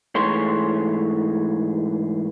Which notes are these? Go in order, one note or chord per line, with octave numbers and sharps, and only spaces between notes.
G#2 E3 A3 G#4 C#5 C6